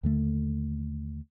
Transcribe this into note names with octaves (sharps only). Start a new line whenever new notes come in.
D#2 D3 A3